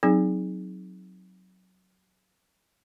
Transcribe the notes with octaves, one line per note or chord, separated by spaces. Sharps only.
F#3 C4 D#4 G#4